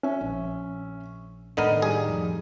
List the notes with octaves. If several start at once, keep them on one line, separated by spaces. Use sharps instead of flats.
C#4 E5
A#1
A2 D3 D#3 B3 A#4 D#5 D#7
G3 D#4 G#4
F2